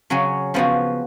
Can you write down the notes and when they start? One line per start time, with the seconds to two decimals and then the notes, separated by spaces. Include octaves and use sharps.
0.10 C#3 F#3 C#4
0.54 C#3 F3 B3 F#4